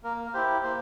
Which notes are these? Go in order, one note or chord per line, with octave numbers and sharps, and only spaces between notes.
A#3 A#4
A#4
E4 G4 C5
A#3 C5